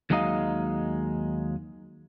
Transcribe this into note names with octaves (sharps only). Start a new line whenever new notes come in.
D#2 F#3 G#3 D#4 D#5 F5